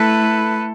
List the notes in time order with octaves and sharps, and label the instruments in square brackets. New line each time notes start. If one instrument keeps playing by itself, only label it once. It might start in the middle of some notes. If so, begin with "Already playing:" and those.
Already playing: [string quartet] A3 E4 A4 [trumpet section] B4